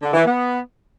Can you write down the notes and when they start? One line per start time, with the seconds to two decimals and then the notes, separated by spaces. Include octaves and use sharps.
0.02 D3
0.14 E3
0.25 B3